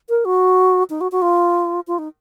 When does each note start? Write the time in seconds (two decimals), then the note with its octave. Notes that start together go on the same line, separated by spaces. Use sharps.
0.09 A#4
0.25 F#4
0.90 D#4
1.01 F#4
1.12 F#4
1.22 F4
1.87 F4
1.99 D#4